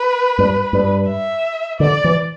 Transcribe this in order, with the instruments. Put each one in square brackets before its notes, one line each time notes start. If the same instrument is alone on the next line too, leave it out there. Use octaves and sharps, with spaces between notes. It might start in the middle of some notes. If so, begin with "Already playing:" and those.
Already playing: [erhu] B4
[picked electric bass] G2
G2
[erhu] E5
[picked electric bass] D3 [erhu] D5
[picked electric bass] E3